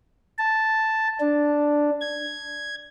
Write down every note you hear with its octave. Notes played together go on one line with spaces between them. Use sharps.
A5
D4
G#6